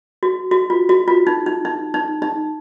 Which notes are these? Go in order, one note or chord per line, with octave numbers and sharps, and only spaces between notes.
F#4
F#4
F4
F#4
F4
D#4
D#4
D#4
D#4
D#4